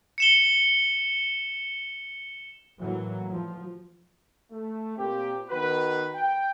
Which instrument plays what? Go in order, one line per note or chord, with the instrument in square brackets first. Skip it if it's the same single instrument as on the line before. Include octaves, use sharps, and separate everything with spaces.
[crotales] C#7 E7 G7
[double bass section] A2 E3 F#3 A#3
F3
[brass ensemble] A3
A#2 A#3 C4 G4
D#3 B3 F#4 B4
G5